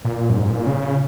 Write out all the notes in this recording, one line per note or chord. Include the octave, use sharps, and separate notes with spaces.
A#2
F#2
G#2
A#2
C#3